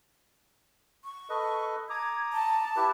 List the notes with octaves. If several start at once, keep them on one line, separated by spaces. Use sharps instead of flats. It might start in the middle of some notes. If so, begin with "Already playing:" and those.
C#6
A4 B4 D#5
A#5 D6 D#6 G#6
A5
E4 G4 B4